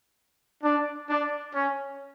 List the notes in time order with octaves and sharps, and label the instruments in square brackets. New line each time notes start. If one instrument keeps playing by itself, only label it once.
[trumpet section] D4
D4
C#4